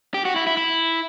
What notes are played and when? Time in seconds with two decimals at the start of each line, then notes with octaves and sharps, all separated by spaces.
0.14 G4
0.25 F#4
0.36 E4
0.47 E4
0.57 E4